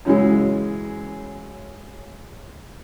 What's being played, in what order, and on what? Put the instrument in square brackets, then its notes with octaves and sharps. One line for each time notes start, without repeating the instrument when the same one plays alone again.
[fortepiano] F#2 C#3 E3 G#3